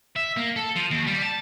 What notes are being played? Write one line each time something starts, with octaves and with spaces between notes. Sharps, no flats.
E5
A#3
A4
F3
D#2
G3
A5